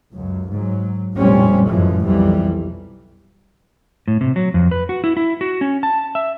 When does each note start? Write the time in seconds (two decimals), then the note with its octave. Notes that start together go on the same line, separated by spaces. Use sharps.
0.13 C#2 F#2
0.51 G#2 F#3
1.16 F1 A#1 A2 G3 C4 C#4
1.68 A1 F#2 E3 F3 G#3
2.05 B1 F2 E3 G3
4.08 A2
4.21 C3
4.36 F#3
4.54 F2
4.71 B4
4.89 F#4
5.04 E4
5.17 E4
5.41 F#4
5.61 C#4
5.83 A5
6.15 E5